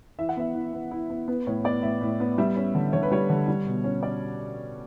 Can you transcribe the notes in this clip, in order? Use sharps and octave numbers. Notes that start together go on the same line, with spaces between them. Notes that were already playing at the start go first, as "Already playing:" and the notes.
E3 E5
F#5
B3 E5
E3
B3
E4
B3
B3 B4
A2 C#5
B3 D5
A2 E5
A2
B3
G3 E5
C#4
D3
D3 C#5
B4
G3 C#5
D3
G3
B2
C#4
C#4 D5